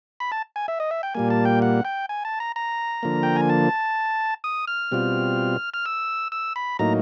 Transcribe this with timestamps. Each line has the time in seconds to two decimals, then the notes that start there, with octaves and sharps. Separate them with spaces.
0.20 B5
0.32 A5
0.56 G#5
0.68 E5
0.80 D#5
0.91 E5
1.03 G5
1.14 A#2 G3 A#3 G#5
1.30 A5
1.45 G5
1.62 F#5
1.85 G5
2.09 G#5
2.25 A5
2.40 A#5
2.56 A#5
3.03 D3 F3 A#3
3.23 G5
3.36 G#5
3.49 A5
4.44 D#6
4.67 F6
4.92 B2 G3 C4 F4
5.74 F6
5.86 E6
6.32 E6
6.56 B5
6.79 A2 F#3 A#3 D#4 A#5